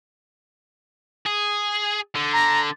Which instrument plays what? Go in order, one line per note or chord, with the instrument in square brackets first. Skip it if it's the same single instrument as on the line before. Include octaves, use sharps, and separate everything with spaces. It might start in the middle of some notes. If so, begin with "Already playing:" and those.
[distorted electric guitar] G#4
D3
[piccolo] A#5